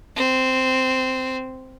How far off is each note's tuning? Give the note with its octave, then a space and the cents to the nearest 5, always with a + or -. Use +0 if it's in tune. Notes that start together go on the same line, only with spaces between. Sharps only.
C4 -10